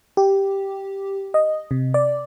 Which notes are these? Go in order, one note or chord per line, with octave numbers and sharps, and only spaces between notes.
G4
D#5
C3
D5